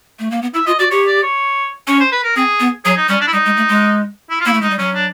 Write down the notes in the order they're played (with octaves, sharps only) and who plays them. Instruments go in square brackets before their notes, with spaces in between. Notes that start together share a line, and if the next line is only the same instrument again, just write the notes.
[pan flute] A3
A#3
B3
[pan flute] E4 [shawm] E5
[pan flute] F4 [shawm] D#5
[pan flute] F#4 [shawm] D5
[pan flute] G4 [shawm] C#5
[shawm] D5
C#5
[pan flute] C#4 [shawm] C#5
[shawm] C5
B4
A#4
[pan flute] C4 [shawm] G#4
[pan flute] B3
[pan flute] F#3 [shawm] G#4
[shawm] D#4
[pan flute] G3 [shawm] C#4
[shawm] D4
E4
[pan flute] G3 [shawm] D#4
[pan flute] G#3
A3
G#3
[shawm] E4
F4
[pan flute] A#3 [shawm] E4
[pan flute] A3
[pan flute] G#3 [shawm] D#4
[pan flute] G3
[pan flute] F#3 [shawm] C#4
[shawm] D4